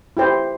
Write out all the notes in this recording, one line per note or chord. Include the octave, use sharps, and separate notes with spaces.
E4 G4 C5